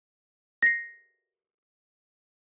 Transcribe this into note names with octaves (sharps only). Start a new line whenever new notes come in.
A#6 C7